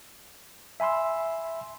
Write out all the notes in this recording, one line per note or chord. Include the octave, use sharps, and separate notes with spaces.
E5 G#5 B5 C6 E6